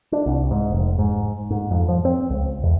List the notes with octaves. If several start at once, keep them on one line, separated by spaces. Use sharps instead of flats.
D4
C2
G#2
F1
G#2
G#2
F2
F3
C4
C#2
E2